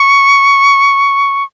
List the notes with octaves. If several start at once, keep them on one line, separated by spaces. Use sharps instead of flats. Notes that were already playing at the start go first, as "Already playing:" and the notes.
Already playing: C#6